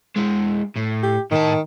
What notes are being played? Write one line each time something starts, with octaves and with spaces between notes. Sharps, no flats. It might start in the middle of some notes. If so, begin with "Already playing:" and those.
G#3 E4
A2
G4
A2 D#3 A5